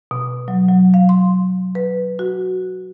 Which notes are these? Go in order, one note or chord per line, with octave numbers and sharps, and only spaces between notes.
B2
F#3
F#3
F5
C6
B4
F#4